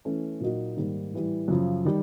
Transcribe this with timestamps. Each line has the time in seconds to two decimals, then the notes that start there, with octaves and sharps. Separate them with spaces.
0.05 E3 A3 C#4
0.40 A#2 F#3 A#3 D#4 F#4
0.77 G#2 D#3 G3 A#3
1.13 A2 E3 G3
1.48 F#2 C#3 F3
1.85 D#3 G3